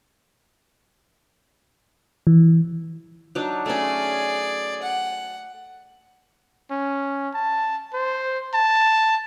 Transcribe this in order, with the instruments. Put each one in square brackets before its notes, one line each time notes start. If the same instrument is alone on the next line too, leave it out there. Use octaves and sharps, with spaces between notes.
[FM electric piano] E3
[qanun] F#3 D4 D#4
[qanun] A3 C#4 [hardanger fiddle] G#4 D5
[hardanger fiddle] F#5
[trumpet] C#4
A5
C5
A5